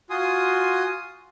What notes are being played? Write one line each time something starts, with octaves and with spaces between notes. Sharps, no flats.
F4 F#4 G#5 C6 D#6